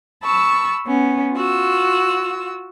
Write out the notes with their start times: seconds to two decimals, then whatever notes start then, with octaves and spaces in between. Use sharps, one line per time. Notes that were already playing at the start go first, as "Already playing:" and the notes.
0.23 A5 B5 C#6 E6
0.86 B3 C#4
1.34 F4 F#4 E6